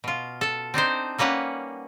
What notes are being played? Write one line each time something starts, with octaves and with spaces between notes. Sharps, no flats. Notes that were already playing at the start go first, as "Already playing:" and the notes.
B2 F4
A4 A5
C4 D4 D#4 C5
G3 A#3 C#4 B4 F#5